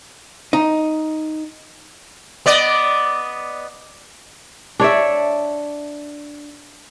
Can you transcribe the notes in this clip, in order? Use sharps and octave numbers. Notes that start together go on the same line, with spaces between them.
D#4
B3 D5 D#5
D4 C#5 D5 E5